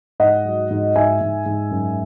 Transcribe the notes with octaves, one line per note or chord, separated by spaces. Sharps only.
G#2 D#5 F#5
F#3
G#2
G#2 E5 G#5
G#2
G#2
F#2